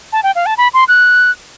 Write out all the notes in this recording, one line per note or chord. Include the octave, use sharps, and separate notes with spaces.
A5
G5
F5
A5
B5
C6
F#6